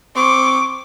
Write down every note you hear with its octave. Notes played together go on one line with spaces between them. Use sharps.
C4 C#6 D6